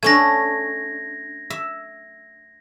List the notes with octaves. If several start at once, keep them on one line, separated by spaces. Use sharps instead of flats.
A3 C#4 D4 G#6 A#6
E5